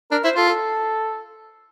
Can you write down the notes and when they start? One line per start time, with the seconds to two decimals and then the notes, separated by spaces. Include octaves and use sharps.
0.11 D4 A#4
0.24 E4 C5
0.36 F4 A4
0.48 A4